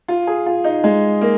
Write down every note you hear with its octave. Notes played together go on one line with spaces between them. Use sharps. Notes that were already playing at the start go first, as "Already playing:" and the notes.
F4
G#4
F4
D#4
G#3
A#3